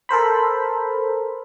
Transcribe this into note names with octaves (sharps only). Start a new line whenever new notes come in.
A4 A#4 C5 B5